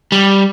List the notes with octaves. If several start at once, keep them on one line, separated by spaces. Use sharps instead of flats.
G3